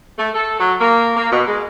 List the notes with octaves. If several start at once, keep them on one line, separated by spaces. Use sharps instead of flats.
A3
A4
F#3
A#3
A#3
B2
G#3